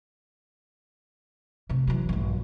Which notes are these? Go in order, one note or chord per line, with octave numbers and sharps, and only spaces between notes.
C3 A3
E3 F#3
A#1 G2